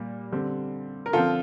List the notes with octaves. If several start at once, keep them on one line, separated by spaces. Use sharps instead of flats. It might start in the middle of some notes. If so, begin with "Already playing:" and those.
Already playing: A#2 G3 A#3
D3 G3 C4
A#4
D3 F3 C4 F4 A4